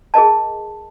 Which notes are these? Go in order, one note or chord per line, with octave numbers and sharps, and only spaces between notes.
G#4 A#4 D#5 A5